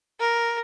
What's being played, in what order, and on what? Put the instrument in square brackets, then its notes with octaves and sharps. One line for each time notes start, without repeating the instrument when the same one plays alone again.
[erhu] A#4